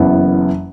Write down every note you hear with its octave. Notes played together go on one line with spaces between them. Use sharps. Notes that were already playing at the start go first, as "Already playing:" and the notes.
Already playing: F#1 F#2 E3 B3